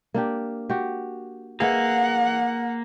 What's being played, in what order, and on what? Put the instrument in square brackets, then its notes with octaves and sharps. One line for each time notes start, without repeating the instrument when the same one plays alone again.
[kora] A#3 D4 G4
F#4 G4
[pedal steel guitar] A#3 [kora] G#4 B4 E5 [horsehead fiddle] F#5